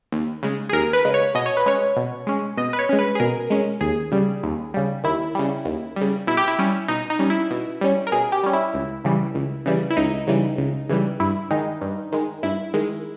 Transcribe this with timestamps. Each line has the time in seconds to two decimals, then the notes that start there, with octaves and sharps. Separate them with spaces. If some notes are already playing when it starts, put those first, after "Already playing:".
0.12 D#2
0.43 C#3 G#3
0.69 G#4
0.73 D#2 A#4
0.93 B4
1.05 C#3 G#3
1.14 C#5
1.35 B2 D#5
1.46 C#5
1.57 B4
1.66 G#3 C#4 C#5
1.96 B2
2.27 G#3 C#4
2.57 B2 D#5
2.73 B4
2.79 C#5
2.89 G#3 C#4
2.99 B4
3.15 G#4
3.20 B2 A#4
3.50 G#3 C#4
3.81 D#2 G#4
4.12 C#3 G3
4.43 D#2
4.74 C#3 G3
5.04 D#2 E4
5.35 C#3 G3
5.65 D#2
5.96 C#3 G3
6.27 B2 E4
6.37 G4
6.48 E4
6.59 G3 C#4
6.88 B2 D#4
7.10 D#4
7.19 G3 C#4
7.30 E4
7.51 B2
7.81 G3 C#4
8.07 A#4
8.12 B2 G#4
8.32 G4
8.43 G3 C#4
8.53 E4
8.74 C#2
9.05 C#3 E3 G3
9.35 C#2
9.66 C#3 E3 G3
9.90 E4
9.97 C#2 D#4
10.27 C#3 E3 G3
10.58 C#2
10.89 C#3 E3 G3
11.20 G2 E4
11.51 D#3 G#3 D#4
11.81 G2
12.12 D#3 G#3
12.43 G2 E4
12.74 D#3 G#3